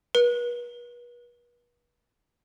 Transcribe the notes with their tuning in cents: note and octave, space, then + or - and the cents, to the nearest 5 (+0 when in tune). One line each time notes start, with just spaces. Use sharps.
B4 -40